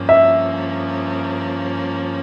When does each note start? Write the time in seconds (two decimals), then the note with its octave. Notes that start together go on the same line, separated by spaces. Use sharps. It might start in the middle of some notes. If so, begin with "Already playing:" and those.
Already playing: G2 F3 A#3 C#4
0.09 E5